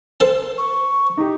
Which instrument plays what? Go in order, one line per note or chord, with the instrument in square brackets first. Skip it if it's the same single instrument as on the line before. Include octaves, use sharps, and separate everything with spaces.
[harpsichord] A4 C5 A5
[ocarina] C#6
[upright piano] D#4 G4